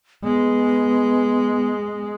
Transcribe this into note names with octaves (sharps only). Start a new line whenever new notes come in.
G#3 B3